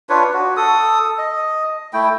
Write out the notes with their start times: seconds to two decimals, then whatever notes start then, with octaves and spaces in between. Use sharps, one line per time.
0.09 D4 F4 B4 C#5
0.34 F#4
0.57 A4 D#6
1.18 D#5
1.93 A3 E4 G5